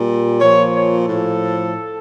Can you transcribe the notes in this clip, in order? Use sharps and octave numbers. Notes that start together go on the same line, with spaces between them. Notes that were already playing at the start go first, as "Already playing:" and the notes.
Already playing: A#2 G3
A#2 F3 C#5
C#5
A2 F3 A4